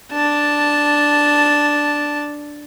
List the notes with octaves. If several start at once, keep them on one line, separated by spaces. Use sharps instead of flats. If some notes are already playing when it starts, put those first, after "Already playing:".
D4 A5